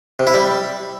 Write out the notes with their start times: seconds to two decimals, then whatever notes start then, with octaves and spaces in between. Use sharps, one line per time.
0.19 C3
0.27 E4
0.34 G3